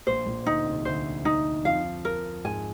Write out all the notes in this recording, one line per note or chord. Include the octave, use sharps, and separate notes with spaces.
A#1 A#2 C5
A#1 A#2
D2 D3 D#4
C2 C3
D2 D3 C5
D#4
F2 F3 F5
A#4
G#2 G#3 G#5